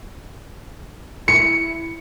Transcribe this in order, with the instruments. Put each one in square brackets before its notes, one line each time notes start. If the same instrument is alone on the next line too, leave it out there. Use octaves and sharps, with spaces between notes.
[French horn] E4 [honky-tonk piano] C#7